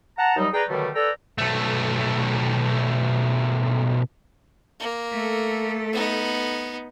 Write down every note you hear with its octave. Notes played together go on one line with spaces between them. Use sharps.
F#5 A5 A#5
D#2 F#3 G3 D#4
G#4 B4 D5 G5 A#5
B2 D3 D#3 F#3 G3 A3
A4 B4 D5 G5 A#5 E6
B1 A3
A#3
A3 A4
B3 D#4